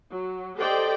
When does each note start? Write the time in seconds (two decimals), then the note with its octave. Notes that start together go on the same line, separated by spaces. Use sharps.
0.11 F#3
0.58 G4 A4 C5 D5 D#5 G5